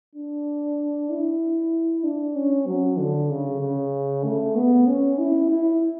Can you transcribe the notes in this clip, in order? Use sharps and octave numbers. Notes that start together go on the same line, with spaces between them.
D4
E4
D4
C#4
F#3
D3
C#3
C#3
A3
B3
C#4
E4
E4